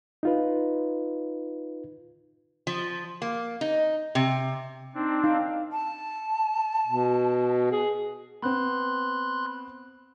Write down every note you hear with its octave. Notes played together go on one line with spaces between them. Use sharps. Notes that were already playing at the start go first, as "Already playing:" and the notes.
D#4 F4 B4
F3
A#3
D#4
C3
C4 D4 D#4
D#4 F5
A5
B2
G#4
B3 C4 B5 C6 F#6